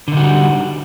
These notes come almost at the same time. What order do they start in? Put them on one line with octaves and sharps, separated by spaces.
D3 D#4 F#4 G3